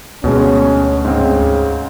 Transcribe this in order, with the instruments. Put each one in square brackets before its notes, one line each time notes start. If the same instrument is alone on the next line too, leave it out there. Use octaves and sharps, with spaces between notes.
[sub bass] D2 [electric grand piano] B2 G#3 [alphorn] C#4
[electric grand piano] G#2 C4 [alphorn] C#3